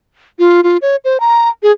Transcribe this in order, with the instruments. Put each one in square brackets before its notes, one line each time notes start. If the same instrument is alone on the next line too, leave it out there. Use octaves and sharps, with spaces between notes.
[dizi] F4
F4
C#5
C5
A#5
G#4